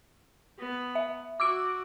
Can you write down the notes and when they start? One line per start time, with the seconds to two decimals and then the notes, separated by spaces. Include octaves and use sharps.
0.59 B3
0.95 E5
1.40 F#4 D6 E6 D7